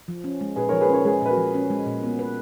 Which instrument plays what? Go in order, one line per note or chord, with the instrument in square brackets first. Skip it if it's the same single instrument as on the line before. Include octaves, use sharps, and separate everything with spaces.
[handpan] F3
C#4
G#3
[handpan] A#2 [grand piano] G#4 B4
[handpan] F3 [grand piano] A#4 C#5
[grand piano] G#4 B4
[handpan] C#4 [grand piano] A#4 C#5
[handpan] G#3 [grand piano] G#4 B4
[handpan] A#2 [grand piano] B4
[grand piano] F#4 A#4
[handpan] F3
C#4
G#3
A#2
B3
B4